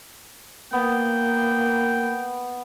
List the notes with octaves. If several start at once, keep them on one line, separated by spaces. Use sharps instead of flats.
A#3 B3 G5